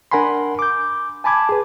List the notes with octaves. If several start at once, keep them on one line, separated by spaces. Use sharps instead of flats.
D4 A#4 F#5 G#5 B5 C6
D6 G6
G#5 A5 B5 D6 G#6
G#4 B4